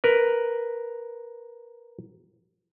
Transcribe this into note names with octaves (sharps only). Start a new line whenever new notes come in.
A#4 B4